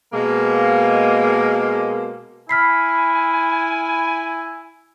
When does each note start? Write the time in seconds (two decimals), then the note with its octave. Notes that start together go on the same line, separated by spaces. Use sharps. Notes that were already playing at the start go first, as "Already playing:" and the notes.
0.13 B2 G#3 A#3
2.49 E4 G#5 B5 F6 B6 C7